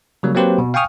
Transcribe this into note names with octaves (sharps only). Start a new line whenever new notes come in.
C#3 F#3 G3 A#3
F#3 A#3 C4 G4 B4 C5
B2
F5 G5 G#5 C#6 D#6 F6